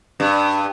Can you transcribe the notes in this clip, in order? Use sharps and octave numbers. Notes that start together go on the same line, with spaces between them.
G2